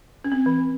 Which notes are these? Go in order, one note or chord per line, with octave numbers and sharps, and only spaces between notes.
C#4
C4
E3